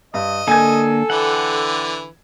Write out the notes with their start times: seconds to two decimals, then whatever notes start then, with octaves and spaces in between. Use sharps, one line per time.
0.14 G2 D#5
0.48 D3 A#3 A4 G#5 G#6
1.10 D3 E3 F#5 G5